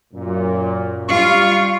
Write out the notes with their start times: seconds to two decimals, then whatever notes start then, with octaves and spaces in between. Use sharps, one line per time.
0.14 F#2 A#2
1.08 G3 F4 C#6